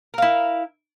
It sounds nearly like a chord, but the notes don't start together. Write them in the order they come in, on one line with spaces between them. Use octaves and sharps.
A#4 F5 E4